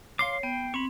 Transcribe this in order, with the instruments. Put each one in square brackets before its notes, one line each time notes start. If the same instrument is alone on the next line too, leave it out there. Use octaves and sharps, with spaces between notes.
[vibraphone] C#5 [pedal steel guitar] F5 C6 D6 [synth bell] C7
[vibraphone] B3 [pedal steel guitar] G5
[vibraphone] C4 [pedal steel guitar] B5 C#6